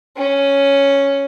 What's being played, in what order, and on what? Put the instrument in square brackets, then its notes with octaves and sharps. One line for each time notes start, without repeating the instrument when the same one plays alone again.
[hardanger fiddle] C#4